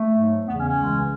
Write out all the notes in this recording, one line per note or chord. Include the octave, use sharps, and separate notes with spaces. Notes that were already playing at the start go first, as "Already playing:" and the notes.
Already playing: A3
G#2 F#3
E2 C#3 E3 B3
C#4
C#4
C#2 C#3 E3 G#3